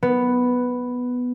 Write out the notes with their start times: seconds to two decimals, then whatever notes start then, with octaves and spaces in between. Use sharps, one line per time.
0.03 B3